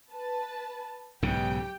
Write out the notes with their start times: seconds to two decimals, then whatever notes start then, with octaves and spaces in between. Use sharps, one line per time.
0.10 B4 A5
1.22 B1 G#2 C#3 G4 G5